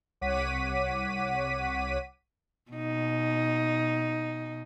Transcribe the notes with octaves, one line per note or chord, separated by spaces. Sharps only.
C2 C#5 F#5 D6 B6 D#7
B2 D#4